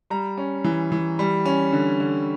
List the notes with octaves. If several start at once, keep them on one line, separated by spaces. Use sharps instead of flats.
G3 A#5
C#4
E3
E3
G3
C#4
D3
D3